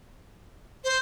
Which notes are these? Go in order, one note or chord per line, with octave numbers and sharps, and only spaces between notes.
C5